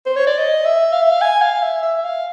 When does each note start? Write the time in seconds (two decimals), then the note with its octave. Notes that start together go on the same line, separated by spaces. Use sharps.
0.06 C5
0.16 C#5
0.27 D5
0.38 D#5
0.65 E5
0.93 F5
1.02 E5
1.11 F5
1.22 G#5
1.41 F5
1.62 E5
1.83 E5
2.04 F5